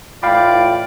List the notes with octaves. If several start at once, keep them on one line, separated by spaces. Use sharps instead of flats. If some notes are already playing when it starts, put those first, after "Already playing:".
A2 E3 F4 D5 F5 G5 B5